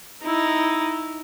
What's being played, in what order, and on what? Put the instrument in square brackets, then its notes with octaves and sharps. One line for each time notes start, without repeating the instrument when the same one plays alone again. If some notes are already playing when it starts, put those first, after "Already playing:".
[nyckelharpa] D#4 E4